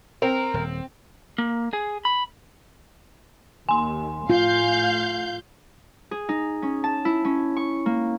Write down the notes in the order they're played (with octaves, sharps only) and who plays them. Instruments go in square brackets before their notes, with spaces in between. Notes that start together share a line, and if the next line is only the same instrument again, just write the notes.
[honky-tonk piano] C4 [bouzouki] A#4
[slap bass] D#1
[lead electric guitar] A#3
G#4
B5
[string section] D#2 [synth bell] G#5 C6
[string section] A2 F5 G6 [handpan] F4
[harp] G#4
D#4
C#4
A5
E4
C#4
C#6
A#3